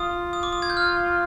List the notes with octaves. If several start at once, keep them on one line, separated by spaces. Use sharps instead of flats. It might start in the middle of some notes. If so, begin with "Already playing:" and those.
Already playing: F4 D#6
D#6
D6
D#6
G#6
G6
F6